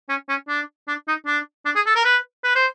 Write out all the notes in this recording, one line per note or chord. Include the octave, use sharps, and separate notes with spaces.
C#4
C#4
D4
D4
D#4
D4
D4
G#4
A4
A#4
B4
B4
C5